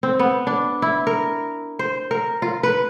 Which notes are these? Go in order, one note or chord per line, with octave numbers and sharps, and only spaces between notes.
C4
B3
D4
E4
A#4
C5
A#4
F4
B4